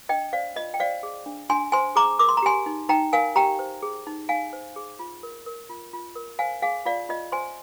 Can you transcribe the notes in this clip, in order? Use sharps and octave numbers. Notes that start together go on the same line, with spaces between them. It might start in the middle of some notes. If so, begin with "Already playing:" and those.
D4 D#5 G5
C5 D5 F5
F4 D#5
G5
C5 D5 F5
G#4
D4
D4 G#5 C6
C5 G#5 C6
G#4 A#5 D6
A#4 D6
C6
A#5
G4 G#5 C6
D#4
D#4 G5 A#5
A#4 F5 G#5
G4 G5 A#5
C5
G#4
D#4
D#4 F5 G#5
C5
G#4
F4
A#4
A#4
F4
F4
A#4
C5 F5 G#5
G#4 F5 G#5
F4 D5 F5
F4 D#5
C5 G#5 C6